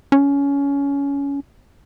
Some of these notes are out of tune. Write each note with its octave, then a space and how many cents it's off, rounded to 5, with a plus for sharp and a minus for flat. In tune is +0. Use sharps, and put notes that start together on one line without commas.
C#4 +20